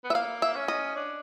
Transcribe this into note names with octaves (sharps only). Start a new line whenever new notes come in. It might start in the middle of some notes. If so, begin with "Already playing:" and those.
B3
E5
A#3 F5
E5
C#4
D#5
D4